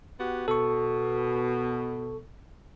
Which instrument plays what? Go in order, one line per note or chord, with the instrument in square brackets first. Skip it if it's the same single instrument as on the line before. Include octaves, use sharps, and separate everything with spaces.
[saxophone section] B3 F#4 G4
[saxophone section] B2 [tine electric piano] A4 C#6